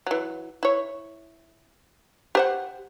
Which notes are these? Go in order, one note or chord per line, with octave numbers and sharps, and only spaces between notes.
E3 F#3
E4 C#5
G4 C5 F#5